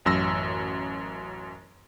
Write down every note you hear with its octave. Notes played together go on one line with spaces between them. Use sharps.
A1 F#2 E6 A#6